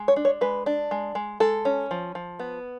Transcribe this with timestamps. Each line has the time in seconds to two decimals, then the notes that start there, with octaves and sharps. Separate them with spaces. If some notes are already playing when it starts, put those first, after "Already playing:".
Already playing: G#3
0.08 C#5
0.16 D4
0.25 C#5
0.41 G#3 B4
0.66 D4
0.91 G#3
1.15 G#3
1.40 G#3 A4
1.65 C#4
1.91 F3
2.15 F3
2.39 B3